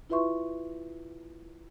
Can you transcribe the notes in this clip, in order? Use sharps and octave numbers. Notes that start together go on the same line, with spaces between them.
E4 F4 B4 E5 C6 C#6